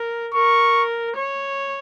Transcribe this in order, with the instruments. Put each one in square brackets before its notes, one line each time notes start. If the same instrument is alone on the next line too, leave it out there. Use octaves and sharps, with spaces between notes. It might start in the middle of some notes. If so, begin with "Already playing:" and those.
Already playing: [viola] A#4
[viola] A#4 [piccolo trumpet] C#6
[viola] C#5